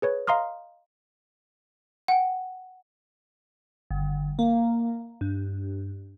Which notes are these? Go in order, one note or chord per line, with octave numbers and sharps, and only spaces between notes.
G#4 B4 C#5
D#5 F5 A#5 C6 D#6 F6
F#5 G5
G1
A#3
G2